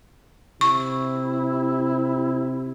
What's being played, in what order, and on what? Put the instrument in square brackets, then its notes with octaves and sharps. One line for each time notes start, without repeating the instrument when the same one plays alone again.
[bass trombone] C3 [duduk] E4 [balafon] C#6